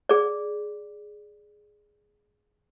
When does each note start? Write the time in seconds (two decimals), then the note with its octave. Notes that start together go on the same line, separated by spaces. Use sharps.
0.09 G#4 D5